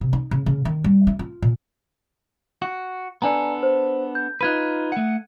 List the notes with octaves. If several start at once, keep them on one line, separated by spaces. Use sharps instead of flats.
C3
D#4
C#3
C#3
D#3
G3
E4
F4
A#2
F#4
B3 D4 A4 D5 G#5 A#5
C5
G6
D#4 F4 B4 F#6 G#6 D#7
A3 F#5